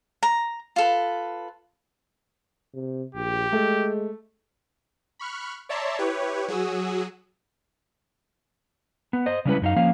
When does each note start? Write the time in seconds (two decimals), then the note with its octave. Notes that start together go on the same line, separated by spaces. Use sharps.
0.23 A#5
0.76 F4 A4 B4
2.75 C3
3.15 A#1 G4
3.53 G#3 A3
5.19 B5 C#6 F6 F#6
5.69 C#5 D5 E5 A5 A#5 C6
5.98 E4 G4 B4 C#5
6.48 F#3 F#4 G#4 D#6 E6
9.13 B3
9.26 C5 D#5
9.45 C#3 G3 G#3 C#4 E4 B4
9.62 F#2 D#4 F5
9.76 F3 A#3 C#4 F5